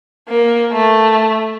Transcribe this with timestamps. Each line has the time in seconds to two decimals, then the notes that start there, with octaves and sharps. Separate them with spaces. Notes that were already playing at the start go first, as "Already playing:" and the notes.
0.29 A#3
0.72 A3